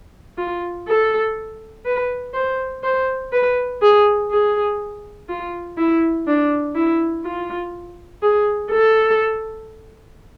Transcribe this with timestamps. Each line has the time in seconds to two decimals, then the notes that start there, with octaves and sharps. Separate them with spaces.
0.38 F4
0.88 A4
1.85 B4
2.34 C5
2.83 C5
3.32 B4
3.82 G#4
4.30 G#4
5.29 F4
5.77 E4
6.27 D4
6.75 E4
7.24 F4
8.22 G#4
8.71 A4